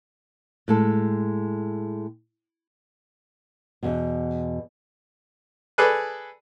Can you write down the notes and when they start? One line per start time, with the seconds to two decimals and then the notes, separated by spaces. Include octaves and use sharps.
0.68 A2 G#3 A4
3.83 E2 B2
5.78 G#4 A4 B4 D5 G#5 F#6